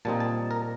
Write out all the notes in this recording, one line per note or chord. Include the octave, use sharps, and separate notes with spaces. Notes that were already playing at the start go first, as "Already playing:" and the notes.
A#2 G3 C4 D#4 A5
A5
A#4